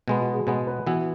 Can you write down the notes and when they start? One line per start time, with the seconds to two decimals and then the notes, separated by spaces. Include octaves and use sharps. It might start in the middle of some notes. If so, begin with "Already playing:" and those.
0.08 B2 G#3 B3
0.21 F#4
0.34 G#4
0.47 B2 G#3 B3 B4
0.67 B4
0.87 E3 B3 E4 F#4